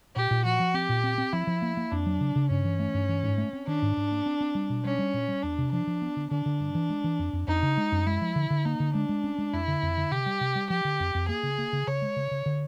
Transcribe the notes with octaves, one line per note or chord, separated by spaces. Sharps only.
A#2 G4
A#2
F3 F#4
F3
C4 G4
A#2
C4
C4
F3 E4
F3
A#3
A#3
F2 D4
F#3
C#3
C#3
G2 C#4
E3
A3
G2
E3
G#2
A3
C4
D#3 D4
G#2
G#2
A#3
C4
C4
G3
B2
G3 C#4
G3
A#2
G3
E2 D4
C3
F3 D4
F3
B3
D3
D3 D4
D3
G2
E3
G#3
E3
F2
F2
F2 D#4
C#3
G#3
F#2
G#3 E4
F3
D3
D3
A#3 D#4
D3
G#3 D4
G#3
C#4
G#3
F2 E4
D3
F2
D3
C3 G4
G3
C3
G3
F3 G4
D3
F2
F2
A#3 G#4
C#3
A#3
C#3
C#3 C#5
G#3
C#3
C#3
D3